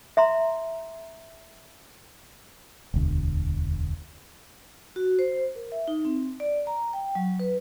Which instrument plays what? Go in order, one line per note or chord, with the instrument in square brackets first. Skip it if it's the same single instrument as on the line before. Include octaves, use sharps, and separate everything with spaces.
[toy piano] E5 A#5 C6
[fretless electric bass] E1 D2
[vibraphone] F#4
C5
A#4
E5
D#4
C4
D5
A#5
G5
F#3
B4